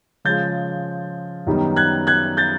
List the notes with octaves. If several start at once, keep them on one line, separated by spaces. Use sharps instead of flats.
C#3 F3 G#3 G6 A6
F#2 D#3 G3 B3 D#4
F#6 G#6
F#6 G#6
G6 A6